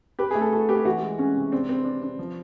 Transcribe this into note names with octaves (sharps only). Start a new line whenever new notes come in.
G4 B4
G#4
A3
A4
F#4 A4
G4 B4
E3 F#4
G#3
G#3 C#4
C3
C4 D4
C4 B4
D4
D4
F3